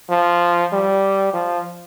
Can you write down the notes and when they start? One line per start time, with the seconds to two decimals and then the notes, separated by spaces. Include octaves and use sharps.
0.09 F3
0.72 G3
1.33 F3